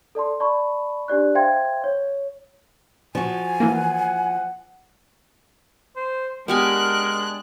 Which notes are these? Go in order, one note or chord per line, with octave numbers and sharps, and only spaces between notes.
A4 D5 A5 C6
D5 A5 B5 C#6
D4 G4 D5 F#6
C5 E5 F5 G5 C6 G#6
C#5
F3 F#4 G#5
E3 A#3 F#5
C5
G#3 B3 D4 G4 A#4 G#5 F#6